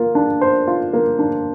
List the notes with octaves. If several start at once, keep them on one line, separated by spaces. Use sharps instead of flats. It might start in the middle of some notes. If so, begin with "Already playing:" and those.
Already playing: A#3 F4
D4
C5
F4
A#3
D4